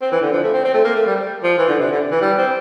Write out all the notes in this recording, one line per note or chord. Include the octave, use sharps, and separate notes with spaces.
C4
E3
D3
F3
A3
C4
C4
A3
A#3
A3
G3
F3
E3
D3
C3
D3
E3
G3
C4